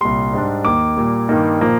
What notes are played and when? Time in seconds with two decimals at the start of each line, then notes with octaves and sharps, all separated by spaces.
0.01 C2 A#2 G3 C6
0.33 G#2 G3 D4
0.65 D#2 D#3 A#3 D6
0.97 A#2 G3 A#3
1.29 G2 D#3 G3 A#3 D#4
1.61 A#2 F3 A#3